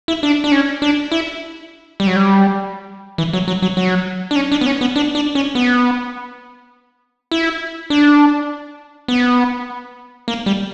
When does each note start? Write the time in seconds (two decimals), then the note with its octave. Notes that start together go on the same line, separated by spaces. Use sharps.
0.08 E4
0.23 D4
0.44 D4
0.52 C#4
0.82 D4
1.12 E4
2.00 G3
2.07 F#3
2.16 G3
3.18 E3
3.33 F#3
3.48 F#3
3.62 F#3
3.77 F#3
4.31 D4
4.36 C#4
4.52 D4
4.61 B3
4.66 C#4
4.81 B3
4.96 D4
5.15 D4
5.35 C#4
5.55 B3
7.31 E4
7.90 D4
9.08 B3
10.28 A#3
10.46 G3